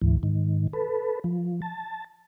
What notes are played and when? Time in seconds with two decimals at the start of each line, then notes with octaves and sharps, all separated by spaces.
0.02 D2 G#2 E3
0.23 G#2 D#3
0.73 A4 B4
1.24 F3
1.62 A5